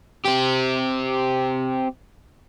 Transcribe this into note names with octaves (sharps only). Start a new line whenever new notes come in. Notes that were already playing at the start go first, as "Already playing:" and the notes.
C4 G4